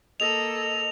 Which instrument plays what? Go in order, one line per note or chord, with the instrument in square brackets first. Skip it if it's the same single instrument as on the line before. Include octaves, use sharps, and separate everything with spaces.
[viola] A#3 A4 [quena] D#5 [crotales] F7